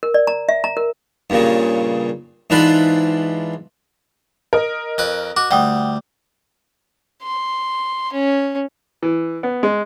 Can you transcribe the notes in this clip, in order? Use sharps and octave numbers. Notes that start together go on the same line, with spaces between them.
A#4
D5
A#5
E5
A#5
A#4
G2 A#2 C#3
G#2 E3 D4 F4 B4 B5
A#4 D#5
F2 B4
F#4 D6
D2 G3 F#5 G5 D#6
C6
C#4
E3
B3
G#3